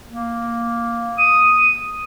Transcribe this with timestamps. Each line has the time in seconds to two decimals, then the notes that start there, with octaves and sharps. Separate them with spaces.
0.07 A#3
1.18 D#6